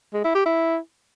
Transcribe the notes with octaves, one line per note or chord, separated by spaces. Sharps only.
G#3
E4
G4
E4